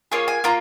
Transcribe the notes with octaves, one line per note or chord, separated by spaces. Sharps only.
A#3 F4 G#4 C#5
G#5
A#3 F4 A#5